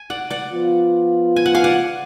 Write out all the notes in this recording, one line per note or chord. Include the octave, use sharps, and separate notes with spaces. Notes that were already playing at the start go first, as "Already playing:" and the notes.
Already playing: G#5
D5 F#5
D5 F#5
F3 B3 F4
G#5
F#5
F5 G#5
D5 F#5